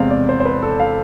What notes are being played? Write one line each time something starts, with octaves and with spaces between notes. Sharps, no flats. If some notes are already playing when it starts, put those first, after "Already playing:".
Already playing: E2 C3 G#3 C4 D5 F5
D5
C5
C5
B4
A4
F5